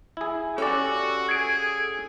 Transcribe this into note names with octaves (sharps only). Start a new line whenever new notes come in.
E4 G#4
C#4 F#4 G4 A4 D5
G#4 G#6 D7